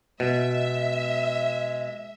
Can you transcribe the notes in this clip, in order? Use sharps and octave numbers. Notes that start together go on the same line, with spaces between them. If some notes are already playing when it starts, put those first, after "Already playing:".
B2 G#3 E5